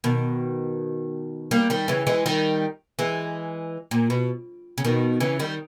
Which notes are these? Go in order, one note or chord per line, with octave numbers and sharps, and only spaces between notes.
B2 D#3
G3 A#3
D#3 G3
C#3 E3
E3 G#3
D#3 G3
E3 G#3
A#2
B2
C#3
B2 D#3
C#3 E3
D#3 G3